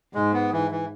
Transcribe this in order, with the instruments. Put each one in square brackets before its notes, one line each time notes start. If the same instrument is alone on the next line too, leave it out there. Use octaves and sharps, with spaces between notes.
[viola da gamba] G#2 [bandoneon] G#3
[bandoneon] B3
E3
E3